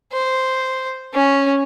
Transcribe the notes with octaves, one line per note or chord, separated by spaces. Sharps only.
C5
C#4